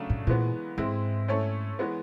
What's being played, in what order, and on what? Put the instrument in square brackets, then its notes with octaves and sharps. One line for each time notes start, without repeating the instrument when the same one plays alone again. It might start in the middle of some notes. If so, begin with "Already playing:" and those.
Already playing: [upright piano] C#3 F#3 A3 D4
[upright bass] A2
[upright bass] A#2 [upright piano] E3 G#3 B3
[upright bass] G#2 [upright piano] G#3 C4 E4
[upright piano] A3 C#4 E4 A4 C#5
E3 G#3 B3